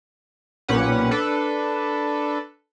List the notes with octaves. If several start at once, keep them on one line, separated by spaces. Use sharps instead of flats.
B1 A#2 C#4 G4 B4 F#5
D4 A4 B4